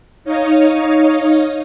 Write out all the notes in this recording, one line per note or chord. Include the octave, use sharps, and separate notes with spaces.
D#4 C#5 D#5 F5